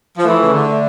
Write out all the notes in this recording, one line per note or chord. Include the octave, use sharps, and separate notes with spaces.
F3
E3 A3
C#3
D3